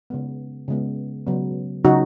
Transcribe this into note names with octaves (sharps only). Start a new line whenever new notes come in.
C#3 G#3 B3
C#3 G#3 B3
C#3 F#3 B3
C#3 F#3 B3 D#4 F#4